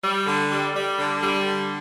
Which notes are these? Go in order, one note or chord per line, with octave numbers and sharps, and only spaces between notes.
G3
D3
G3
G3
D3
G3
D3